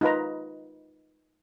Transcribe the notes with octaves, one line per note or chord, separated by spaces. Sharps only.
D#4 F4 B4 A#5